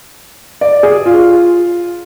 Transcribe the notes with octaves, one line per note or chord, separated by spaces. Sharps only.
D5
G#4
F4